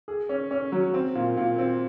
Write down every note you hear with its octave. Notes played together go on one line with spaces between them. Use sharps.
G#4
C#4
C#4
F#3
C4
A#2
A#2
C4